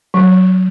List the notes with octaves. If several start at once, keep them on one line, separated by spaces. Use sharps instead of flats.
F#3